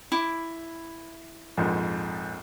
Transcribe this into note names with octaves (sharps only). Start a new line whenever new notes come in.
E4 D6
A#1 F2 G#2